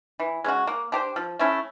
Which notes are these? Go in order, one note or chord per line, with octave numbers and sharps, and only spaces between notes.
E3
G#3 C#4 F#4
A#3
D4 G4 C5
F3
A3 C#4 E4